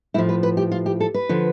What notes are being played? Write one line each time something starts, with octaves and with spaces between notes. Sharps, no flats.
A2 F3 E4
B4
B4
G4
F4
G4
A4
B4
D3 F3